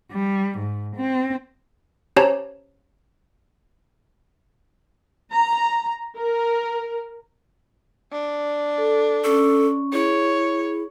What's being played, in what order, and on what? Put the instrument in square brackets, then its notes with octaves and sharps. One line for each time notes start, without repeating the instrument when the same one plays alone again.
[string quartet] G3
G#2
C4
[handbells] C#4 G4 C5 C#5 A5 A#5
[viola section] A#5
A#4
[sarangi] D4
[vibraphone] A4
[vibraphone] C#4 C#6 [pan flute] A4
[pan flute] E4 [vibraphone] G#4 [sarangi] C#5